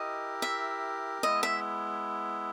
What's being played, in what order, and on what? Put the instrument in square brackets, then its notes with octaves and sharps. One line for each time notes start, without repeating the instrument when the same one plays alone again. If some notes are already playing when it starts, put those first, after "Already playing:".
Already playing: [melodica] E4 G4 A#4 [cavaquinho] D#5
[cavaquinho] E5
[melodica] G#3 B3 E4 [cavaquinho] D#5
[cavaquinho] E5